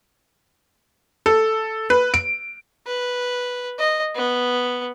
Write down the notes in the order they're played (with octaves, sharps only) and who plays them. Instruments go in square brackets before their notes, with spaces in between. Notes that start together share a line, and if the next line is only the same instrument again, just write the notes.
[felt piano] A4
B4
D7
[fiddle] B4
D#5
B3